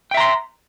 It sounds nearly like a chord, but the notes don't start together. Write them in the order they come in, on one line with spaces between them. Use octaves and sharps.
G5 E5 A#5 C6